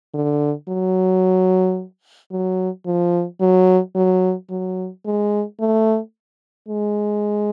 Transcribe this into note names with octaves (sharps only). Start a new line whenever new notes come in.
D3
F#3
F#3
F3
F#3
F#3
F#3
G#3
A3
G#3